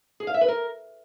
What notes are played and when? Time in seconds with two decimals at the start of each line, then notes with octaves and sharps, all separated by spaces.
0.20 G#4
0.27 F5
0.34 E5
0.41 B4
0.48 A#4